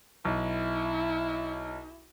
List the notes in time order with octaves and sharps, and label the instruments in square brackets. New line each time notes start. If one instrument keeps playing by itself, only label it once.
[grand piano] B1 [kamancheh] E4